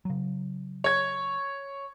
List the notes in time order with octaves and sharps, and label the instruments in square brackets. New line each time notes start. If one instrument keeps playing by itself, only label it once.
[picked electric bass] C#3 F#3
[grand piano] C#5 G#6